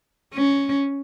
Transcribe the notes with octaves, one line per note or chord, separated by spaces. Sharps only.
C#4